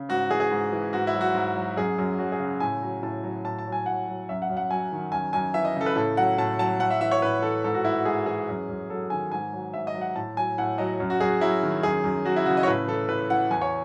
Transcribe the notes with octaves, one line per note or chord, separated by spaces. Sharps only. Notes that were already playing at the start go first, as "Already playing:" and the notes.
Already playing: C#3
G#2 F#4
E3 G#4
G#4
G#2
E3
G#2 F#4
E4
F#3
F#4
G#2
F#3
F#2 G#4
F#2
F#3 F#4
G#4
C#3
A2 G#5
F#3
A2 A5
F#3
A2 A5
A5
F#3
G#5
A2 F#5
F#3
F#2 E5
F#5
F#2
F#5
F#3 G#5
D#3
F#2 G#5
F#2 G#5
E3 E5
D#5
C#3 A4
B4
A2 A4
F#3 F#5
A2 A5
F#3 A5
A2 F#5
E5
E3 E5
C#5
A2 B4
E3 A4
G#2 A4
F#4
E3 E4
F#4
G#2 G#4
E3 G#4
F#2
F#2
F#3 A4
D#3 G#5
G#2 G#5
F#3
G#2 E5
D#5
F#3
F#5
A2 A5
F#3 G#5
A2 F#5
F#3 D#5
F#2
F#4
F#2 G#4
F#3 E4
D#3
F#2 G#4
F#2
F#3 F#4
E4
C#3 F#4
D#5
C#5
A2 B4
E3 A4
A2 B4
E3 F#5
E2 G#5
C#5